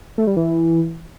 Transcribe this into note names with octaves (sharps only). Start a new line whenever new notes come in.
A3
G3
E3